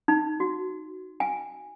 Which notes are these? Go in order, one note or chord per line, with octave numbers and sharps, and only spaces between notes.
D#4
F#4
G#5